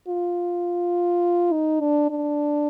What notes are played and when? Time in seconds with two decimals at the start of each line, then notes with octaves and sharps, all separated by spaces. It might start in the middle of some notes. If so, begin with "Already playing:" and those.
0.08 F4
1.52 D#4
1.80 D4
2.10 D4